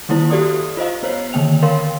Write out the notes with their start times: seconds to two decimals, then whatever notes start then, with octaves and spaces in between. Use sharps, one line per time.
0.09 D#3 G3 A#3 E4 C5
0.30 F#4 G4 A4 D5 D#6
0.77 F4 C5 D#5 F5
1.03 B3 C5 C#5
1.33 D3 D#3 A#3 G5 F7
1.62 A#4 C#5 F5 G5 C6